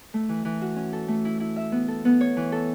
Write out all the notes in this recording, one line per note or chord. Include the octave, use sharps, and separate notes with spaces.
A3
E3
E3
F#4
C#4
A4
A3
E4
E4
E5
B3
A4
B3
C#5
E3
A4